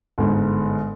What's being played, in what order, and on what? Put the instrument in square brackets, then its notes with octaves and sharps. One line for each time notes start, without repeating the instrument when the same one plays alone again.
[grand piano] G1 G#2